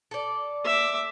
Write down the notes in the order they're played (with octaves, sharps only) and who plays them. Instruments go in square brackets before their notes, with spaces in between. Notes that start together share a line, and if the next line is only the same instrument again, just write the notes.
[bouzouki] A4 D5
[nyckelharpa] E5 D6